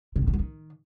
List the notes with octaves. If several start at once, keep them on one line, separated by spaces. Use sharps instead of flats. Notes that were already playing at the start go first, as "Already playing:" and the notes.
C3
A2
D3
F#3
D#3